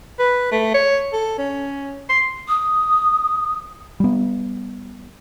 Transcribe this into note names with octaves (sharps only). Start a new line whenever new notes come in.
B4
A3
C#5
A4
C#4
C6
D#6
G3 B3